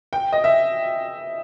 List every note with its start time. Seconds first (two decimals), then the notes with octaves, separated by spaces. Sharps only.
0.13 G5
0.33 D#5
0.44 E5